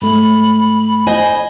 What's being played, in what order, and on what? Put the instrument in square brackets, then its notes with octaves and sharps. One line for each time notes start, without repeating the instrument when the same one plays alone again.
[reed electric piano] G#2 A3 [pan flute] B5
[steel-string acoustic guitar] C5 D#5 G#5